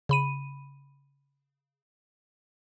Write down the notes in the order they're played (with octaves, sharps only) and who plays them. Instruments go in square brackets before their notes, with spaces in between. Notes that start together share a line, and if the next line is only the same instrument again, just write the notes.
[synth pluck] C#3 B5 D#7